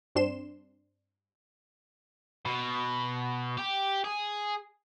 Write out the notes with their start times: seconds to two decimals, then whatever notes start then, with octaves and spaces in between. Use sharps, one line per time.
0.15 G2 C4 D4 C6 E7
2.45 B2
3.58 G4
4.04 G#4